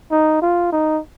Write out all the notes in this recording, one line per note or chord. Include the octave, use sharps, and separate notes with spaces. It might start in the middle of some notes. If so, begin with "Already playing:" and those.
D#4
F4
D#4